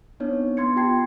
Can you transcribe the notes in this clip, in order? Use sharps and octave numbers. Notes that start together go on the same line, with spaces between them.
B3 C4 D4 D#4 C#5
B3 C6 G#6 C#7
F4 G4 G5 A5 G#6 C7